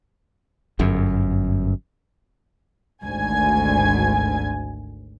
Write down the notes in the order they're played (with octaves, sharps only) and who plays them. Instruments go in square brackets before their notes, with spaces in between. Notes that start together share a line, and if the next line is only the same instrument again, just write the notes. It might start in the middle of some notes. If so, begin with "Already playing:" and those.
[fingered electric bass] G1 F#2
[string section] G#1 D2 G#5 G#6